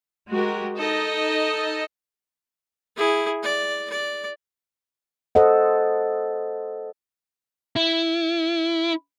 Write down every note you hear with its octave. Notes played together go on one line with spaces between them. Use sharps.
G#3 F#4 G4 A#4
D#4 A4 D#5
E4 G#4
D5
D5
A4 C5 D#5 F#5
E4